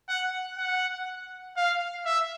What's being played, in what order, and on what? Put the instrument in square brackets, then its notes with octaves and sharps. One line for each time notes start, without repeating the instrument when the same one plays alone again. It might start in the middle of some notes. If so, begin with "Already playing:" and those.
[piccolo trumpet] F#5
F#5
F5
E5